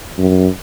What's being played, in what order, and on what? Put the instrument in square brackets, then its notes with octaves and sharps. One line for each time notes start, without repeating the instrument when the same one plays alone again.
[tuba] F#2